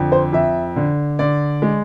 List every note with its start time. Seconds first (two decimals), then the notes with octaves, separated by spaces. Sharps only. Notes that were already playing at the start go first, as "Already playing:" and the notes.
Already playing: F2 D3
0.12 C5
0.33 F2 E5
0.76 D3
1.19 D3 D5
1.62 G#3